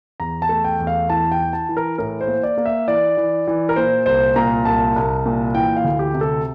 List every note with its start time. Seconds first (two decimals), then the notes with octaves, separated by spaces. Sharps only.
0.20 E2 A#5
0.42 A5
0.49 A3
0.64 G5
0.79 E2
0.87 F5
1.09 E3 A5
1.32 G5
1.39 E3
1.53 A5
1.69 E3
1.77 A#4
1.98 A2 A#4
2.21 C5
2.27 A#3
2.43 D5
2.58 A#3
2.66 E5
2.88 E3 D5
3.17 E3
3.47 E3
3.69 A#4
3.76 A#2 C5
4.06 C2 C5
4.36 A#2 A#5
4.65 C2 A5
4.96 C2
5.26 A#2
5.54 E3 G5
5.77 F5
5.84 D2
5.99 G4
6.14 C3
6.21 A4